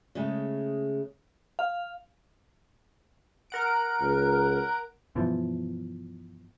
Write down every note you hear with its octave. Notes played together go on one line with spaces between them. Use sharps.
C#3 G#3 A3
F5
A#4 F#5 D7
C#2
G2 B2 E3 F3